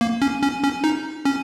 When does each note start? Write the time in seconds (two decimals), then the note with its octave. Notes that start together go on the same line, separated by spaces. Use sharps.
0.01 A#3
0.22 C#4
0.42 C#4
0.64 C#4
0.84 D#4
1.25 C#4